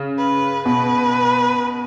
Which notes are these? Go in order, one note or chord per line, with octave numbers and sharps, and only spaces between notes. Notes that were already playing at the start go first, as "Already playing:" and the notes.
Already playing: C#3
B4
B2 B4